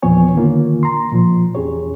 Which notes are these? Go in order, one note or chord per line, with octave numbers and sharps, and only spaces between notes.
E2 A#2 F3 B3 C#5 G#5
D3 D#3 A#3 F4
A#5 C6
A#2 F3
E2 C#4 G4 G#4 C#5